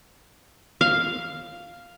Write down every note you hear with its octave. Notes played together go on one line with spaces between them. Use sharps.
F5